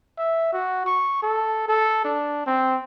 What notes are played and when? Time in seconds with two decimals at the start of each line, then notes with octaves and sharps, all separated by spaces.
0.18 E5
0.53 F#4
0.86 C#6
1.23 A4
1.68 A4
2.05 D4
2.47 C4